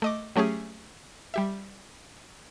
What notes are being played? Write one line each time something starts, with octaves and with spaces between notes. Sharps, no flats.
A3 D#5 D6
F#3 A3 C#4 G4 G#4
G3 G4 E5